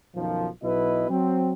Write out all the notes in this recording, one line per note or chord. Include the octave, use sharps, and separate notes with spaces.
B1 F#2 D#3 F3
B1 B2 E4 B4 D#5
F#3 C4